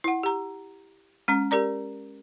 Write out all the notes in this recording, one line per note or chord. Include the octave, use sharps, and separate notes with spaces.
E4 F#5
G4 A#5
G#3 C#4 A#5
G4 A#4 D5 A#5